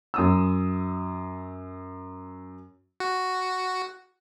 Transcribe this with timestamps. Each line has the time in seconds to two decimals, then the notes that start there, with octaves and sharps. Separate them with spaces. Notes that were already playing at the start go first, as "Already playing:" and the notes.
0.14 F#2 D#6 E6
3.00 F#4